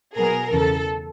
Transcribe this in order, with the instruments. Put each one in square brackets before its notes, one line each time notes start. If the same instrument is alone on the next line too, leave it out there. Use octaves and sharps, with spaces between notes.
[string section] B2 F#3 B3 G#4 A#4
E2 C#3 E3 A4